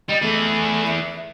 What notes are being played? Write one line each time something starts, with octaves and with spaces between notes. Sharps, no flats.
G3 D#5
E3 A3 G#4
E5